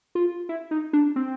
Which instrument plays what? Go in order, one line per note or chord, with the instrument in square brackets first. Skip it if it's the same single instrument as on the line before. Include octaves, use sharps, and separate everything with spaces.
[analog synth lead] F4
E4
D#4
D4
C4